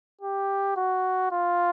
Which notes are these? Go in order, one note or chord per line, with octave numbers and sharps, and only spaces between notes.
G4
F#4
F4